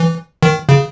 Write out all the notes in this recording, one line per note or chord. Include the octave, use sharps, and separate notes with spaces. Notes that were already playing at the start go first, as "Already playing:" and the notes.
Already playing: E3
D#3
C#3